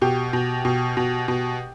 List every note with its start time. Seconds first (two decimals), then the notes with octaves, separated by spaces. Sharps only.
0.02 B2 G4
0.33 B2
0.65 B2
0.97 B2
1.28 B2